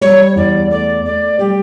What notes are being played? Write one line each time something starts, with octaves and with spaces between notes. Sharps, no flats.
G3 C#5
E2 D5
A3 D5
A3 D5
G3 G4